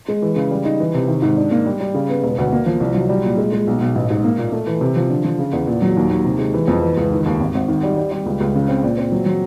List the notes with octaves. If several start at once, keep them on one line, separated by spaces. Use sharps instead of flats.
G#3
E3
C#3
G3
D#4
E3
C3
D#3
G#2
D4
A#3
G3
G3
C#3
B3
E1
D2
A#3
F3
C2
F#3
G3
A#2
G#3
G#3
B1
B1
A1
G#2
A#3
A#2
A3
E3
C3
F3
D3
F3
C#3
E2
A#2
F#3
D#2
D#2
C3
G#3
E3
F2
E3
C#2
D#3
D#2
G#1
G#1
D#3
G3
G3
G3
C#2
C#2
C#3
C4
A#2
C4
F#3
F#3